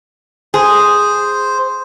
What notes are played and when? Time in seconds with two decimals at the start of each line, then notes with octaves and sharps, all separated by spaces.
0.54 G#4 C5